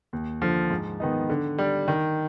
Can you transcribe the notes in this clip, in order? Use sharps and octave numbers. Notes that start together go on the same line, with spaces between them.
D#2
D3 F3
G#2
D#3 B3 D#4
D3
G3 D4
D#3